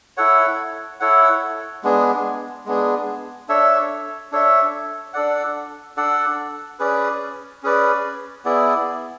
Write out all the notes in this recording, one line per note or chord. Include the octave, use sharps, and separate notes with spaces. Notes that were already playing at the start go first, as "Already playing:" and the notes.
E4 A4 C#5 F#5
E4 A4 C#5 F#5
G#3 B3 D4 G#4
G#3 B3 D4 G#4
D4 A4 C#5 E5
D4 A4 C#5 E5
D4 A4 D5 F#5
D4 A4 D5 F#5
C#4 G#4 B4 D5
C#4 G#4 B4 D5
B3 E4 G#4 D5